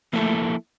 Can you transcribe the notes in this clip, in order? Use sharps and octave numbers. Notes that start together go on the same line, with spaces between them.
F3 A3 A#3 E4 A4